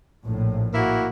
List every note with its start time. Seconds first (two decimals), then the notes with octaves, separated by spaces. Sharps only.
0.25 A#1 A2
0.74 A#3 E4 F#4